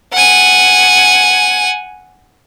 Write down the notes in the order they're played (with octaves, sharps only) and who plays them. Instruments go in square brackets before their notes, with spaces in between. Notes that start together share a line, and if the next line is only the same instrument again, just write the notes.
[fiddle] F#5 G#5